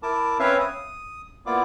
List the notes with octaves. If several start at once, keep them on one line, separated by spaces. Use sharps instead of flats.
E4 A#4 A5 D6
C4 C#4 B4 C#5 E5 F5
D#6
A#3 B3 E4 F4 D5 D6